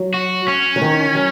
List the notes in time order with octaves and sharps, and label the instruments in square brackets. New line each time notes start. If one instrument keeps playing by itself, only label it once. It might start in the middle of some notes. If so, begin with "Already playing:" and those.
Already playing: [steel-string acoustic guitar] F#3
[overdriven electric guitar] F#4
C#4
[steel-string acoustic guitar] F#3
D#3
F#3